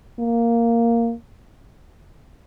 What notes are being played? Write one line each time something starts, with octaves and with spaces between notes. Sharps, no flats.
A#3